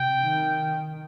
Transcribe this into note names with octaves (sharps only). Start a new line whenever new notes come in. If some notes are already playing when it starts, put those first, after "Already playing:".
Already playing: C3 G5
D#3